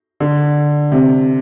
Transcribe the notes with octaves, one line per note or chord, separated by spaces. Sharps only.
D3
C3